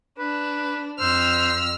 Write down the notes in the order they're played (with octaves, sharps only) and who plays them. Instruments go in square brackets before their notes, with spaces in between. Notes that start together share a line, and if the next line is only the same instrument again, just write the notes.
[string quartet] D4 [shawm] B4
[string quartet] F2 E6 F6 [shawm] C5